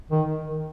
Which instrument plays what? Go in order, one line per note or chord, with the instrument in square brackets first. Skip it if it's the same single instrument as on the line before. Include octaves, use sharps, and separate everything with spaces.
[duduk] D#3